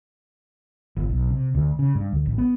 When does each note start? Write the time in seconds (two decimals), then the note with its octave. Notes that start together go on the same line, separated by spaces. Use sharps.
0.97 G1
1.09 B1
1.30 C3
1.55 D2
1.79 C#3
1.95 G2
2.12 D2
2.26 A1
2.38 B3